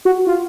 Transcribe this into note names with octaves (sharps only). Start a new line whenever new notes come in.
F#4
F4